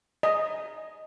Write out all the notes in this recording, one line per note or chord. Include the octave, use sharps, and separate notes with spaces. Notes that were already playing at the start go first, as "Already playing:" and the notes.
D#5